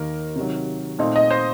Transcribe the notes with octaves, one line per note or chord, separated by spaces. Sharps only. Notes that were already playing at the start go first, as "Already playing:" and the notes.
Already playing: D#2 D#3 A#3 D#4 A#4
C3 D#3 F#3
A#2 A3 C4 D#4
D#5
C5